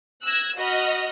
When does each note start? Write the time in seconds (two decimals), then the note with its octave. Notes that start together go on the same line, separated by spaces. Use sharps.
0.23 E6 F#6 G#6 A#6
0.58 F#4 D#5 B5 F6